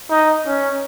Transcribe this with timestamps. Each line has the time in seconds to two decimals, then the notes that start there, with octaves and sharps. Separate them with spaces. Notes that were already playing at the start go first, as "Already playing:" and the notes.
0.10 D#4
0.46 C#4